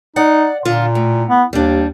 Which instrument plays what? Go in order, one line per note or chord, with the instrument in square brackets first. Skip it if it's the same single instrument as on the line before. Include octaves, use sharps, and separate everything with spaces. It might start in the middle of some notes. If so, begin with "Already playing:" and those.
[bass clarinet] D#4 [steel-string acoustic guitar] D5 F#5
[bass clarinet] A#2 [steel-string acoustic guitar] D3 F4
[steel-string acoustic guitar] A2
[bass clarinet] B3
[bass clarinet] D#2 [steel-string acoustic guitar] G3 D4